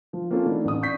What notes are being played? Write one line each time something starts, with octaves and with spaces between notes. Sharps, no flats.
F3
A#3 C4 C#4 F4 A4
E3 A3 B3 D4 D#4
A1 D#6
D5 C#6 G6 B6